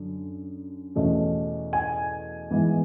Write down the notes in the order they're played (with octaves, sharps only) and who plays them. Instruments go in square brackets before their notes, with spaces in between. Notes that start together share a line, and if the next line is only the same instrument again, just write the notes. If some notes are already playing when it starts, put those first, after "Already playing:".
Already playing: [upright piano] F#2 D3
E2 B2 A3 C#4
G#5
G#2 E3 B3